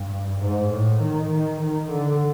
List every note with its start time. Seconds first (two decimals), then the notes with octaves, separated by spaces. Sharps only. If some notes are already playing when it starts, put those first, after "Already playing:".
Already playing: G2
0.41 G#2
0.70 A2
1.01 D#3
1.30 D#3
1.60 D#3
1.90 D3